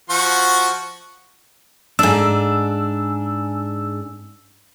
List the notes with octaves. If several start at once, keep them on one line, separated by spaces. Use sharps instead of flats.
F3 F#4 C#6
G#2 D4 E6